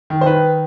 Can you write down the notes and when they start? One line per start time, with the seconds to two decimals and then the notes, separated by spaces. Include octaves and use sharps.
0.10 D#3
0.21 C5
0.26 D#3 B4